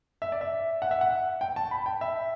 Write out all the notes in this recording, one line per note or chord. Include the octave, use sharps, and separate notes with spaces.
E5
D5
E5
F#5
E5
F#5
G5
A5
B5
G5
E5